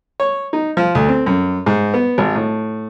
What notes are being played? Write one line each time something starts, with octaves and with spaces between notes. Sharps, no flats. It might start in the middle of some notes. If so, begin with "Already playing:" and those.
C#5
D#4
F3
D2
C4
F#2
G#2
B3
G#1
A2